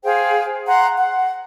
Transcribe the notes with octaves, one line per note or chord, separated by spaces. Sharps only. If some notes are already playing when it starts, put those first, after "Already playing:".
G#4 C5 F5 G5
F#5 A#5 C6
F#5